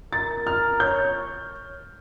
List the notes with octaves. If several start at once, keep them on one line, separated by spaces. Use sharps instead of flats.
A#4 A6
F6
C#5 G6